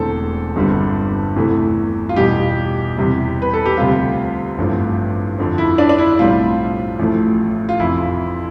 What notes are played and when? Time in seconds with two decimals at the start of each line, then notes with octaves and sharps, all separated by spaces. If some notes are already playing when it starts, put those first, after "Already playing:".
Already playing: E1 E2 D3 A3 C4 A4
0.56 G1 G2 D3 G3 C4
1.36 E2 C3 E3 A3
2.09 F4
2.16 E2 B2 G3 G4
2.97 E2 C3 G3
3.42 B4
3.53 A4
3.66 G4
3.77 D2 C3 G3 C4 F4
4.58 A1 G2 F3 A3 C4
5.38 F2 D3 F3 C4
5.58 E4
5.78 D4
5.89 D4
5.99 E4
6.19 B1 A2 G3 C4 F4
6.99 A1 A2 F3 A3
7.69 F4
7.79 F1 F2 E3 E4